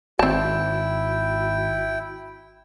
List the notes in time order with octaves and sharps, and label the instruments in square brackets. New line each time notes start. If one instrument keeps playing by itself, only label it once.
[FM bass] G#1 [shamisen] C4 A5 [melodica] E4 G5 [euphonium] F#4